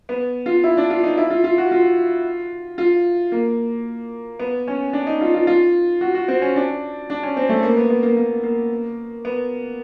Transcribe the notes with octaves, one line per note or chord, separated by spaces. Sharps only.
B3
F4
E4
D4
F4
D#4
E4
F4
F4
F#4
F4
F4
A#3
B3
C#4
D4
D#4
F4
F4
F4
F#4
F#4
C4
C#4
D4
D4
C#4
C4
A3
A#3
B3
B3
A#3
A#3
A#3
B3